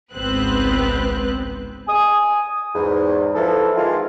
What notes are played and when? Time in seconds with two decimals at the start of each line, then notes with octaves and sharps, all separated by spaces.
0.14 G#1 C#2 B3 C4 B4 F#6
1.87 G#5 D#6
2.74 E2 G#2
3.35 E3 F3 A4
3.76 D#3 E3 G#3 F4